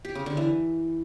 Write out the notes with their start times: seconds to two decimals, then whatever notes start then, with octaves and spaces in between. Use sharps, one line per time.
0.05 G4
0.15 C#3
0.26 D3
0.37 E3